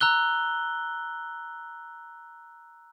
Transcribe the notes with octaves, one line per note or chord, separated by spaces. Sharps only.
A#5 E6 F#6 G7